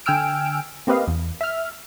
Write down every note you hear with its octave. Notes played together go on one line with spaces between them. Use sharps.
D3 G5 G#5 E6 F6 D7
A#3 C4 G4 B4 D#5 F5
E2
E5 F6